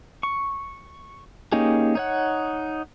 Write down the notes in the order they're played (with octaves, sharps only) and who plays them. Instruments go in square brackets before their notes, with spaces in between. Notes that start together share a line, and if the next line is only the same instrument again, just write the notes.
[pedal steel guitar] C#6
A#3 C#4 D#4 G4 G#4
D#4 C#5 F#5